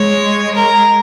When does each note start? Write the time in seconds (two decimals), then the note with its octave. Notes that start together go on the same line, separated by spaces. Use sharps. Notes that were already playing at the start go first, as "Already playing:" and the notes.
Already playing: G#3 C#5
0.55 A#4